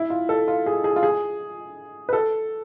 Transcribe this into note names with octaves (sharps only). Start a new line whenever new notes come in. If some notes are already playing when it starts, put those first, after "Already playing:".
Already playing: E4
F4
A4
F4
G#4
G#4
F4
G#4
B4
A4